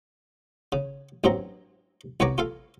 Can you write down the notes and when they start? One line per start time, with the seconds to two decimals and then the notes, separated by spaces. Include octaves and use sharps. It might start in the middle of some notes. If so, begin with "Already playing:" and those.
0.72 C#3
1.24 A1 G2 F#3 C4 A#5
2.20 C2 B3 B4 C#5 A#5 D6
2.38 F4 A4 F5